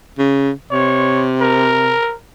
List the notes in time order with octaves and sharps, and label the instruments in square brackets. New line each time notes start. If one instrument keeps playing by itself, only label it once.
[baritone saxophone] C#3
[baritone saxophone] C3 [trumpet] C#5
[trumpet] A#4